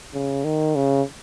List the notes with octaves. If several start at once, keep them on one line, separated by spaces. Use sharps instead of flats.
C#3
D#3
C#3